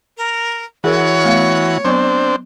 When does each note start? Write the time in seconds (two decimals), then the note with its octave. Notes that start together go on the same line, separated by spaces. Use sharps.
0.17 A#4
0.84 E3 F#4 G#4 A#4 C#5 F#5
1.25 A3 B3 F5
1.85 F#3 B3 C4 D4 C5 C#6